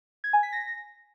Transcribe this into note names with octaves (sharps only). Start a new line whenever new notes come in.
G#6
G#5
B6
A#6